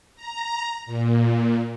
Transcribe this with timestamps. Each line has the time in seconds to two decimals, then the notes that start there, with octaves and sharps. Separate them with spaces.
0.15 A#5
0.86 A#2